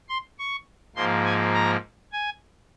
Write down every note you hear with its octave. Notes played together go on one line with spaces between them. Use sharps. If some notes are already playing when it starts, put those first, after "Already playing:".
C6
C#6
G#2 F3 A#3 C6
G#5
A#5
G#5